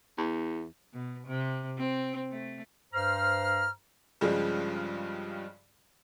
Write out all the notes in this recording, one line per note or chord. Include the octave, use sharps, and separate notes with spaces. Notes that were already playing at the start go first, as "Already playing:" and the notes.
E2
B2
C3
C4
A3
G2 C5 A#5 F6
G2 C#3 F3 G3 G#3